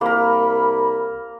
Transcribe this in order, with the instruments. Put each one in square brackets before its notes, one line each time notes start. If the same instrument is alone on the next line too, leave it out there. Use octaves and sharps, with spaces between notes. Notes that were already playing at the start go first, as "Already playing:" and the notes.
[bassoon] C2 [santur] A#3 A#4 [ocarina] B5